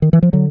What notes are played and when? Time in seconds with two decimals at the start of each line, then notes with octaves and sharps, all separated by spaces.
0.02 D#3
0.13 E3
0.23 F3
0.33 D3 F#3